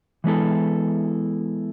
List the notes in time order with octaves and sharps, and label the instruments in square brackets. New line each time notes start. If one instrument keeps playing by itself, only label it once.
[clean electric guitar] E3 G#3 B3 E4 A4